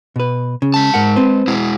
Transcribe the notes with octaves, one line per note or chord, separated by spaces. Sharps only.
B2 B4
C#3
G#3 A5
G#2 A#4 F#5
C4 B4 C5
B2 G#3 E4